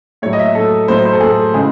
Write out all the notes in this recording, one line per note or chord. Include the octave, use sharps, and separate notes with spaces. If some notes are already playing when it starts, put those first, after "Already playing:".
A2 F#3 C#5
D#5
E5
A2 F#3 A4
A2 F#3 C5
C5
A4
A2 F#3 G#4
A4
C#3 E3 G#3 G#4